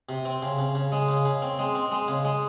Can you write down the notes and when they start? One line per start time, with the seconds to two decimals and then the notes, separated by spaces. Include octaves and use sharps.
0.09 C3
0.25 C4
0.42 C#3
0.59 C#3
0.75 C#3
0.92 G#3
1.08 C#3
1.25 C#3
1.42 C4
1.59 G#3
1.75 C4
1.92 G#3
2.08 C#3
2.25 G#3